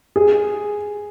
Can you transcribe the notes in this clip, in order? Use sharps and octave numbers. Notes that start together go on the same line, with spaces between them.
G#4